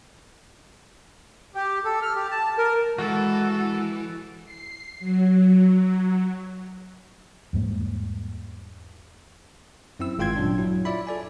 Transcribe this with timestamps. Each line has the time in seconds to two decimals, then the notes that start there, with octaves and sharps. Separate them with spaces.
1.55 G4
1.85 A4
2.02 F6
2.15 G4
2.31 A5
2.58 A#4
2.98 E3 G#3 F#4 A4
4.44 C7
5.00 F#3
7.53 E2 G#2 G3 A#3
9.99 F#2 C4 E4 E6
10.18 G#1 G#3 F4 G5 C6 G#6
10.36 F#2 A#2 F#3 D4
10.58 F#3 E4
10.85 F4 D5 E5 B5
11.07 A4 D5 G#5